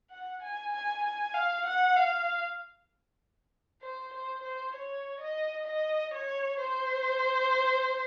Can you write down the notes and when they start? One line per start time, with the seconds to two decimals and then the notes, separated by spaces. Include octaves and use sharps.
0.10 F#5
0.42 G#5
0.72 G#5
1.04 G#5
1.34 F5
1.66 F#5
1.96 F5
3.82 C5
4.13 C5
4.43 C5
4.75 C#5
5.20 D#5
5.67 D#5
6.14 C#5
6.61 C5